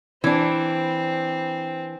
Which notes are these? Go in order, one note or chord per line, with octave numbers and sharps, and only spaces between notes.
E3 C4 D4